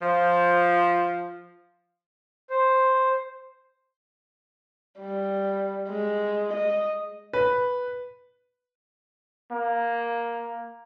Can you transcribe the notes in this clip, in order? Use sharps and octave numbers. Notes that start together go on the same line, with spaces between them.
F3
C5
G3
G#3
D#5
B4
A#3